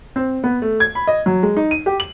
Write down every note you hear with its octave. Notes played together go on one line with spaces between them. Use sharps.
C4
B3
A3
G#6
B5
D#5
F#3
G#3
D#4
D#7
G4
F#7